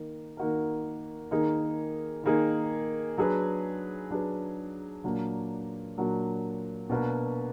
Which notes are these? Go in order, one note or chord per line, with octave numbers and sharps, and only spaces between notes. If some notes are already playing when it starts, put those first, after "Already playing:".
Already playing: D#3 A#3 D#4 A#4
D#3 A#3 D#4 F#4 A#4
D#3 A#3 D#4 G#4
D#3 A#3 D#4 G#4
F#3 D4 G#4 B4
F#3 D4 G#4 B4
A#2 F#3 A#3 D4 F#4
A#2 F#3 A#3 D4 F#4
B2 A#3 D4 F#4 B4